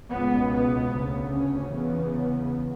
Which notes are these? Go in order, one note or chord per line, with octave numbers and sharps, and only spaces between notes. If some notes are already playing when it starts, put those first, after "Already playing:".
C#2 B2 B3
B3
D2 C#3
C#4
E2 C#3 B3